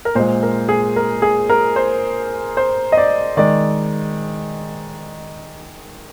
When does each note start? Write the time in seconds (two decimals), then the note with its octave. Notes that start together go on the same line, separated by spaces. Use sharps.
0.05 A#4
0.15 A#2 G#3 C5
0.43 A#4
0.69 G#4
0.96 A#4
1.22 G#4
1.50 A#4
1.76 C5
2.57 C5
2.92 D#5
2.97 D5
3.37 D#3 G#3 D5